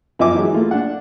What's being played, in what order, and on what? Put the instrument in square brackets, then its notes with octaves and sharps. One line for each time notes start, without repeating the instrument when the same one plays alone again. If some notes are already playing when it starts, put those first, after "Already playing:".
[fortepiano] F#2 F3 D#5 E5 G#5 D6
E3 F#3 G#3
A3 A#3 F4
D4 F#5